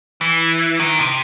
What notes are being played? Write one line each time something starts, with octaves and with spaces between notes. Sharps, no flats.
E3
D#3
C3